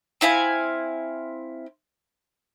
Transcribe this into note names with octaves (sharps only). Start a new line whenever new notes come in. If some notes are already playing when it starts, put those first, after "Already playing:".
C4 E4 F5 G#5